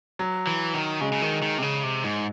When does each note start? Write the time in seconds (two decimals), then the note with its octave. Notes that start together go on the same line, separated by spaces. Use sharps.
0.19 F#3
0.47 E3
0.74 D#3
1.01 C#3 G#3
1.12 C#3
1.22 D#3
1.42 D#3
1.58 C3
1.62 C#3
1.83 C3
2.04 G#2